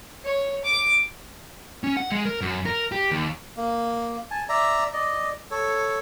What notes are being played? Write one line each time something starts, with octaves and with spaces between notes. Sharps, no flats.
C#5
D6
C#4
F#5
G#3
A#4
F#2
A#4
G4
D#2
A#3
G#5 A5
D5 E5 A#5
D5 D#5
A4 C#5